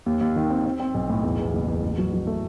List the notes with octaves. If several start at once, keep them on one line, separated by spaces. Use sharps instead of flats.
D#2
D#2
D#3
C4
C4
C4
B1
A2
E2
E2
F#1
E2
A1
F#3
F#3
A3